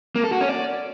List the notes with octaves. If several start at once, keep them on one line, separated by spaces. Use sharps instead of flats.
A#3
A4
F#4
C#4
D5